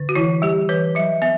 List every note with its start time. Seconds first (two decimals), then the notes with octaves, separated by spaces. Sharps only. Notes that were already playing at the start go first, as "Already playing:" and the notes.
Already playing: D3
0.09 F#4
0.15 E3 E4
0.42 G3 G4
0.69 E3 B4
0.95 F#3 E5
1.22 B3 E5